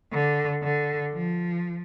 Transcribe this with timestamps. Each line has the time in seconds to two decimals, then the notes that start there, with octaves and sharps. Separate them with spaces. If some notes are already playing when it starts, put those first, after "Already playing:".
0.12 D3
0.62 D3
1.13 F3